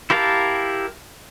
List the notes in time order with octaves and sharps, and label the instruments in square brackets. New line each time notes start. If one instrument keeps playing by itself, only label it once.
[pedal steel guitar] E4 G4 A#4 F5 A5